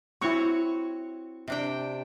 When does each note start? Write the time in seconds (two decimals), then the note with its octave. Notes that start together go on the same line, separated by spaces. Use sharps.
0.21 C4 E4 F#4 C#5 C#6
1.48 C3 D4 G5